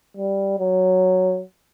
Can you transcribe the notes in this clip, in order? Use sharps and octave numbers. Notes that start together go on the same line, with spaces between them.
G3
F#3